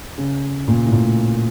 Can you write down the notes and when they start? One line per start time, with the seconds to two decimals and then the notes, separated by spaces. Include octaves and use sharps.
0.18 C#3
0.68 A#2
0.86 A2
0.93 A#2